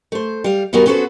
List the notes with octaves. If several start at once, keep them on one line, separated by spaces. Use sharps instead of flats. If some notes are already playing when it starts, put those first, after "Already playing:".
A3 C5
G3 F5
E2 G3 B3 F#4 A#4 G#5
B3 C#4 F#4 A4 B4 C5